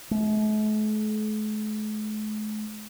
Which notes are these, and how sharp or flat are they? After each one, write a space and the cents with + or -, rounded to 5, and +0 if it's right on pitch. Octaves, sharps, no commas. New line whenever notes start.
A3 -45